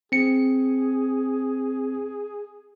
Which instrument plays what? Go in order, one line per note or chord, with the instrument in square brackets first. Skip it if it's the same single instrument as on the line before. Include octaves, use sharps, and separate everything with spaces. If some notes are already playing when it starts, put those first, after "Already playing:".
[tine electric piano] C4 C#7 [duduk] G#4